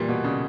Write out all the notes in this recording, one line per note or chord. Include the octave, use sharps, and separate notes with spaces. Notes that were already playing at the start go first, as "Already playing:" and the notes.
Already playing: A#2 E3 G3
B2
C#3